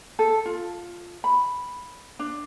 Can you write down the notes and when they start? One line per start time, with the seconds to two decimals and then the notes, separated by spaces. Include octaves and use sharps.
0.19 A4
0.46 F4
1.24 B5
2.19 D4